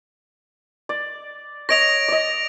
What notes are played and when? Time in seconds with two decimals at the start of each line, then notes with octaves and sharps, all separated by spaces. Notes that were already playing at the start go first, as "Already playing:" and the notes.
0.89 D5
1.69 C#5 D#5 A#6 D7 F7
2.08 D5 D#5